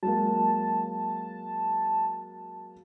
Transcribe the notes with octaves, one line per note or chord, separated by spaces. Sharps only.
F#3 G#3 A#3 A5